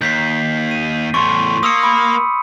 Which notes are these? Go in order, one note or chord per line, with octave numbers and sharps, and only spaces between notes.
D#2 G6 B6 C7
D#7
E2 A2 C6 C#6
A#3 D#6 E6 C#7
B5